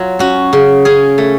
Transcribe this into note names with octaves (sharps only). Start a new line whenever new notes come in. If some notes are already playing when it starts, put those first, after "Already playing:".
Already playing: F#3 F4
C#4 F#4
C#3
C#4 G#4
A3